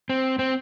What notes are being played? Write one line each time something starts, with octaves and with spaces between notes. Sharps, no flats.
C4
C4